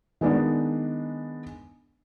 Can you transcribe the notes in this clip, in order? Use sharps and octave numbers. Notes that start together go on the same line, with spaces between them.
D#3 G#3 B3 D4 D#4